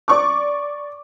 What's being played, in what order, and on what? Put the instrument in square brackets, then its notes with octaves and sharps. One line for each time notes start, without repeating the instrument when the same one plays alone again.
[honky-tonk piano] D5 C#6 D6